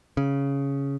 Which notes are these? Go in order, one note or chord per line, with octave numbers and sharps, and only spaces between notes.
C#3